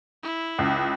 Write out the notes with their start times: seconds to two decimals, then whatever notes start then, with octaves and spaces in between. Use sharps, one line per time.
0.23 E4
0.58 C#2